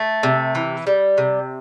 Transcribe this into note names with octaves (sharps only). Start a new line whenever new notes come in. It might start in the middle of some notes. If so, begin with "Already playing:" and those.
Already playing: A3
C3
E3
G3
C3